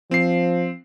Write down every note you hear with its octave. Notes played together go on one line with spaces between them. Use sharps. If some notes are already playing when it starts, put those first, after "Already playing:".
F3 C4 C7